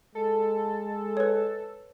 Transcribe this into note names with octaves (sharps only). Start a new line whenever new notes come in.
G#3 A4
B4 C#5